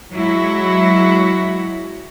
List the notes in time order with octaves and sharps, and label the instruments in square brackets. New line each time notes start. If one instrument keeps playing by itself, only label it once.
[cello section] F#3 G#3 E4 F#4